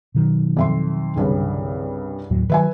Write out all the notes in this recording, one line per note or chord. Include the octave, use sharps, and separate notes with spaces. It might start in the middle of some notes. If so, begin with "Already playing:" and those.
B2 D#3 F#3
F2 E5 C6
C2 G2 C#3
D#2 A2 F#3
D#3 E3 F#3 B4 E5 G#5